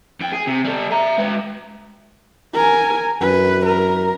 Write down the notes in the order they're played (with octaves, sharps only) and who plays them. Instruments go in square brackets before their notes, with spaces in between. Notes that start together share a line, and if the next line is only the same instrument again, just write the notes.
[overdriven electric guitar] F2 G5
G#4
C3
G3 A4
E5 A#5
G#3 B4
[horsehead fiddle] A#4 G#5
[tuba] F#2 [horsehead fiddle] B4
[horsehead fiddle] A#4